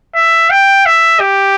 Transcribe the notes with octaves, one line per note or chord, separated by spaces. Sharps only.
E5
G5
E5
G4